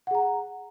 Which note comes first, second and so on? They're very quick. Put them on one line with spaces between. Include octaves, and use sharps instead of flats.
F#5 G#4 A#5